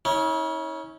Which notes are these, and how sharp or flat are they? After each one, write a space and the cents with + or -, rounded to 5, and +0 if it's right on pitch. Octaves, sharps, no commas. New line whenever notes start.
C#4 +0 E4 -45